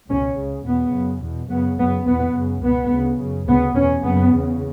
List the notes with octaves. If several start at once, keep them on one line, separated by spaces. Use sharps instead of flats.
C#2 B2 C#4
C#2 C#3
E2 B2 B3
F#2 C#3
E2 B2
F#2 C#3 B3
F#2 C#3 B3
E2 B2 B3
F#2 C#3
C#2 B2 B3
D2 C#3
F#2 C#3
D2 C#3 B3
E2 B2 C#4
F#2 C#3 B3
E2 C#3